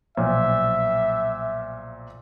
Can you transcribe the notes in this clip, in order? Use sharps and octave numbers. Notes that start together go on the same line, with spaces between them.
B1 A#2 F3 E5